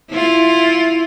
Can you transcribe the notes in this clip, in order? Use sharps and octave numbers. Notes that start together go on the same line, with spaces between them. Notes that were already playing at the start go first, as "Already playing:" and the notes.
E4 F4